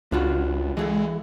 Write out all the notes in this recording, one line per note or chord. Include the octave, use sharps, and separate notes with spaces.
C#2 D4 F4 F#4
E3 G#3 G#4 A4